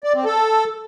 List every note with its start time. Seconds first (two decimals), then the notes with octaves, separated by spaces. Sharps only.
0.04 D5
0.14 C4
0.25 A4